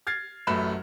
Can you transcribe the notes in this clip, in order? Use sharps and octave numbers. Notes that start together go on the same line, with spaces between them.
F6 G#6 A6 C7
A1 F#2 A3 B4 B5 E7